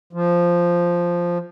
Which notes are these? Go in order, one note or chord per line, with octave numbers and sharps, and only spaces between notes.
F3